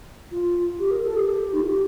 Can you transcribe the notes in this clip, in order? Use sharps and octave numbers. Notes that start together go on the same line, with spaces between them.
F4
G4
A#4
A4
G4
D#4
F4
G4